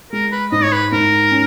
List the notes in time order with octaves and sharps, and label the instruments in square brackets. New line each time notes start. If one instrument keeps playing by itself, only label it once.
[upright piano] G#3 [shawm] A#4
[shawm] B4
[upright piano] G#2 [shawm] D#5
[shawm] C#5
B4
[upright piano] G#2 [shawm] A#4
[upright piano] C#4